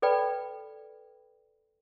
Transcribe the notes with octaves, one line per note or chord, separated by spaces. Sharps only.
A4 B4 D5 G5 B5